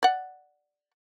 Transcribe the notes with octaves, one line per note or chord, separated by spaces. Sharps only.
D5 F#5